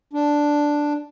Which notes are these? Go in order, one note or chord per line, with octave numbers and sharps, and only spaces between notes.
D4